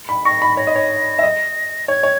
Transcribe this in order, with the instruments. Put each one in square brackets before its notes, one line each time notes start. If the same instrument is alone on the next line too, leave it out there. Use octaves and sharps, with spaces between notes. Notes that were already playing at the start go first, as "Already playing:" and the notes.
[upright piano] B5
[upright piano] C#6 [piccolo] A#6
[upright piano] B5
[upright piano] C#5 [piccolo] A#6
[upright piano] D#5
C#5
E5
D#5
[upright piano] C#5 [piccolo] G#6
[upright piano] C#5